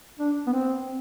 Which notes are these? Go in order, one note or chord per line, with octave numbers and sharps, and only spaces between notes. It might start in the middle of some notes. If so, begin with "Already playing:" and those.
D4
B3
C4